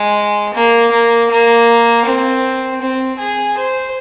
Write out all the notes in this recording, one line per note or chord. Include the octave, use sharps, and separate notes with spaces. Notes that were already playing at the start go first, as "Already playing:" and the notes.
Already playing: G#3
A#3
A#3
A#3
C4
C4
G#4
C5